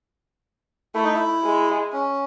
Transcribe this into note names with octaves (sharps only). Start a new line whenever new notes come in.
A3 E4
D#4
E4
G#3
C#4